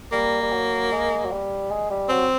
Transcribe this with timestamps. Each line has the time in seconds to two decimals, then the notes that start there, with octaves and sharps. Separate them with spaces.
0.12 G3 A#3
0.42 G3
0.51 F#3
0.92 G#3
1.24 F#3
1.31 G3
1.71 G#3
1.90 G3
2.09 F#3 C4